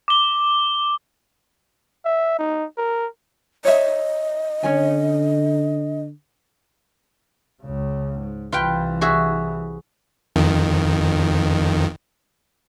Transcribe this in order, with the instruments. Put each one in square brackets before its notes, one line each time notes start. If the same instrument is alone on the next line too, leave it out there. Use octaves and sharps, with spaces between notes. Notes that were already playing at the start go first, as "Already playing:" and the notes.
[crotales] D6 G7
[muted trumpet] E5
D#4
A#4
[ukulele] C#5 E5 [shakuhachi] D#5
[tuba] D3 [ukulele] C#4 C#5 G#5
[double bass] C#2 C#3
G#2
[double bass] C2 E3 [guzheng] F4 B4 G5
[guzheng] F#4 G#4 E5
[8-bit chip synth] F2 D#3